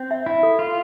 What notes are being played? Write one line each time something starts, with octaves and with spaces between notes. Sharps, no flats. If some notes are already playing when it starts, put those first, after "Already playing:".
Already playing: C4
E5
E4 E5
A4
F4 A4